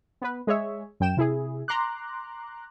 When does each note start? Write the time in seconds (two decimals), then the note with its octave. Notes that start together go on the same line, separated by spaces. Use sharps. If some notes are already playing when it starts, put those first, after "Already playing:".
0.22 B3 B4
0.47 G#3 G#4 C#5 E5
1.00 F#2 G5 E7
1.17 C3 E4 G#4
1.68 A#5 C6 D6 F#6